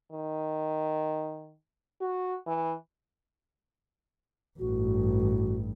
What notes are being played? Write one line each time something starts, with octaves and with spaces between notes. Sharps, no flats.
D#3
F#4
E3
A1 G2 F#4